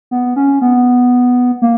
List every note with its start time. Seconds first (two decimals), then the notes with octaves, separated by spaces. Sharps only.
0.11 B3
0.36 C#4
0.62 B3
1.62 A#3